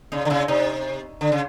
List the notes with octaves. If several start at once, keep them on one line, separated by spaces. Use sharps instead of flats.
C#3 D#4
D3
C#3 E4
C3 D#4
D3
C#3